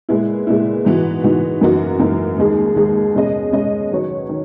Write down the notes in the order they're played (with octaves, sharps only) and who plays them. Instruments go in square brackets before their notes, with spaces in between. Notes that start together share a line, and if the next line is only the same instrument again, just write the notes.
[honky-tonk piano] A#2 G#3 B3 E4
A#2 G#3 B3 E4
G#2 E3 B3 D#4 F#4
G#2 E3 B3 D#4 F#4
F#2 E3 A#3 D#4 F#4
F#2 E3 A#3 D#4 F#4
D#2 D#3 G#3 D#4 G#4
D#2 D#3 G#3 D#4 G#4
B2 G#3 C#4 G#4 D#5
B2 G#3 C#4 G#4 D#5
D#3 F#3 B3 F#4 C#5
D#3